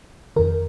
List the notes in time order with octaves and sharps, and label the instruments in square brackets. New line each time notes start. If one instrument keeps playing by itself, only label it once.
[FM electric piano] F2 D#3 A#4